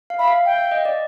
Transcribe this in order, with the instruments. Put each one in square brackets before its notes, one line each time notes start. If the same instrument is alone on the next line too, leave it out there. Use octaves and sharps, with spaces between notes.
[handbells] F5
[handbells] E5 [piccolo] B5
[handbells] F5
[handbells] F5 [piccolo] G5
[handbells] E5
D#5
D5